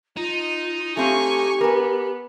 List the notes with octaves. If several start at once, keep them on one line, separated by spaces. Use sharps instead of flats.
D#4 F4
A3 C4 G4 F5 G#5 C#6
B3 A#4 G#5